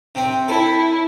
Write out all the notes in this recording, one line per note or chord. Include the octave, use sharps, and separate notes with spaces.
C3 C4
E4 A4